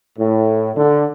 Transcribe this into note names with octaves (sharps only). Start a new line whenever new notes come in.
A2
D3